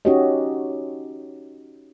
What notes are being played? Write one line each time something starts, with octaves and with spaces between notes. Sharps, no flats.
C#4 D#4 F#4 G4 C#5 D#5